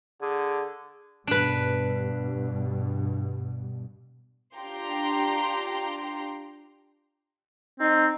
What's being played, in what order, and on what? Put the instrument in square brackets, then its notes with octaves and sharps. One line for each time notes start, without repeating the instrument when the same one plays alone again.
[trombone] D3 [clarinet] G#4
[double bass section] G2 B2 [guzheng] D4 B4
[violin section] D4 F4 G4 G5 A#5 C6
[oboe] C4 [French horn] D#4